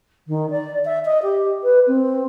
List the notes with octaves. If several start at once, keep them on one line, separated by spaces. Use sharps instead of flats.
D#3
D5
E5
D#5
G4
B4
C4